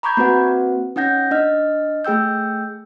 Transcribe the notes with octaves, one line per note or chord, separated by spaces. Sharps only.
A#5 B5 C#6 D6 G6 G#6
A#3 C4 F#4 B4 F#5
C#4 D#4 F#5 G6 A#6
D4 D#5 F6
A3 G#4 G5 E6 G6